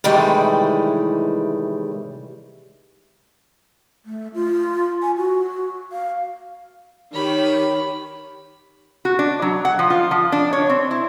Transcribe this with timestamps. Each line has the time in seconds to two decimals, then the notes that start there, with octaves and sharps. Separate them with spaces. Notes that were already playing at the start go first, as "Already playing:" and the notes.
0.04 A2 C3 D#3 E3 G3 G#3
4.05 A3
4.34 F4
5.02 G#5
5.17 F#4
5.92 F5
7.13 D#3 G4 C#5 B5
9.05 F#4
9.19 D4
9.42 F#3
9.65 F#5
9.79 F3
9.90 F4
10.11 F3
10.32 D4
10.53 C#5
10.70 C4
10.91 E4